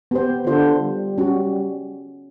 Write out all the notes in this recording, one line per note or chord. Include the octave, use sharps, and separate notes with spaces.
B3 G4 C5
D3 F4 C5
G3
C#4 F#4